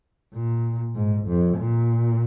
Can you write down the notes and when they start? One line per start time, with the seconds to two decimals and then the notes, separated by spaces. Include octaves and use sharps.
0.34 A#2
0.95 G#2
1.27 F2
1.58 A#2